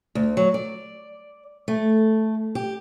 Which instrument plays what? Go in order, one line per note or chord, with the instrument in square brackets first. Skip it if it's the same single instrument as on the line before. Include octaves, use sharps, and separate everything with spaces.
[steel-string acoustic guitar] D2
F#3
D5
A3
G4